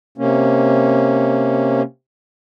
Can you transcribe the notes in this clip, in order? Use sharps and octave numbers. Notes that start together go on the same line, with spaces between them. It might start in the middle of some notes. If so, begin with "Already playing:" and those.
C3 A#3 C#4